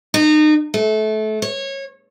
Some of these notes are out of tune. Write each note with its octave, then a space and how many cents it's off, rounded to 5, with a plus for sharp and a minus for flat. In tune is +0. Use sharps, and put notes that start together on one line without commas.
D#4 -35
A3 -25
C#5 -20